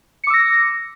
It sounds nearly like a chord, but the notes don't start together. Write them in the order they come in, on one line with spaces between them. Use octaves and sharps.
C#7 D6 E6 A#6